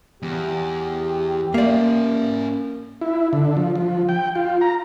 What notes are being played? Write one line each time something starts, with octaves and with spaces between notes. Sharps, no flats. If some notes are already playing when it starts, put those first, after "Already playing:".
E2 G4
A#3 C#4 D5 E5
E4
D3
F3
F3
G5
F4
A#5